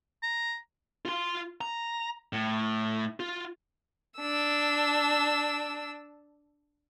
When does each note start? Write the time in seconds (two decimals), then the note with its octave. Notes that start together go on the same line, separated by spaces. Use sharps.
0.23 A#5
1.05 F4 C6
1.61 A#5
2.33 A2
3.20 F4
4.19 D4 E6